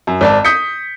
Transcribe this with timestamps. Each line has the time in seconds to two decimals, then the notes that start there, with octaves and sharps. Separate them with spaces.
0.07 F#2
0.21 G#1 D5 A5
0.45 D#6 G6 B6 C#7